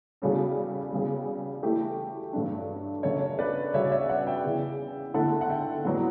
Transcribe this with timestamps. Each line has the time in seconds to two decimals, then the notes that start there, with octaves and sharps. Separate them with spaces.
0.22 E2 C#3 G3 C#4 F#4 A4
0.93 E2 C#3 G3
1.63 E3 A3 E4 G4
2.33 G2 F#3 A3 D4
3.03 F#2 C#3 F#3 A3 D4 A4 C#5
3.39 B4 D5
3.74 C#3 G3 C#4 F#4 C#5 E5
3.85 D5
3.91 C#5 E5
4.09 D5 F#5
4.27 E5 G5
4.44 E2 C#3 E3
5.14 D3 A3 E4 F#5 A5
5.41 F#5
5.49 E5 G5
5.85 A2 F#3 B3 D5 F#5